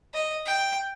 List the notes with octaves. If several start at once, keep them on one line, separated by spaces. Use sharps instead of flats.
D#5
G5